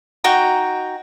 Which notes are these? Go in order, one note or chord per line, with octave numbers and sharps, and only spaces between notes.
D#4 F#4 G5 A#5